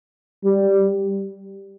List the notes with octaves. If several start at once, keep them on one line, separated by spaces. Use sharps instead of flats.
G3